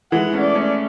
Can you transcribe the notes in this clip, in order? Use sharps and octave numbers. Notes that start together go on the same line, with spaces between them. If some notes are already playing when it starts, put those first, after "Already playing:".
E3 G#3 F#5
A3 C#4
D5
A3 C#4